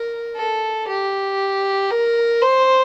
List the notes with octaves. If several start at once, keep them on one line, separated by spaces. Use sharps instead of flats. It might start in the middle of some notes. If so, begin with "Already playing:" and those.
Already playing: A#4
A4
G4
A#4
C5